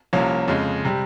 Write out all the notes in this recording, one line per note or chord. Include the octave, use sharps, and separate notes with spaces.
C2 C3 F3 A#3 C#4
F2 C#3 G#3
C3 G3